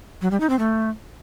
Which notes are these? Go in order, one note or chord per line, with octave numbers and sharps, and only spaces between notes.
F#3
G3
D#4
C4
A3